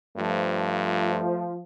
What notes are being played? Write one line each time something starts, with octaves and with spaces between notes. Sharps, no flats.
G2 F3 A3